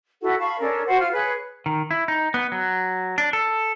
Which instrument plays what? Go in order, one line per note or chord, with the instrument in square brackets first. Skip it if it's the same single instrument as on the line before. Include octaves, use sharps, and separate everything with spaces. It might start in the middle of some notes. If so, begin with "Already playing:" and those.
[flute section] E4 F#4 A4 F#5
F5 A5 B5 C#6
C#4 D4 A4 A#4
F#4 C5 F#5
F4 F6
G#4 B4 C#5 F#6
[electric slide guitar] D#3
E4
D#4
B3
F#3
D4
A4